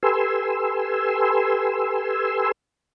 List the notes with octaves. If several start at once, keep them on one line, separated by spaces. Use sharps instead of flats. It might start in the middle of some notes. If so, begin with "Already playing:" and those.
G4 A4 B4 G#5 C6 E6